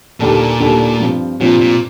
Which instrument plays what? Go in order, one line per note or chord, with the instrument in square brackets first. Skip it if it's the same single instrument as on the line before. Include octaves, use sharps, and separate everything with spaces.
[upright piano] D#2 D3 G3 D4 A4 [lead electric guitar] A#2
[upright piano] D#2 D3 G3 D4 A4
G2 F3 C4 F4
[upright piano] G2 F3 C4 F4 [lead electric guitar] A#2
[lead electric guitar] A#2